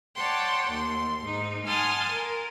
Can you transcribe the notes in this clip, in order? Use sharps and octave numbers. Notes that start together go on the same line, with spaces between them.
C#5 D5 F#5 G5 A5 C6
D#2 C6
G#2 D#4
F#5 G#5 A5 C6 D#6 F6
A#4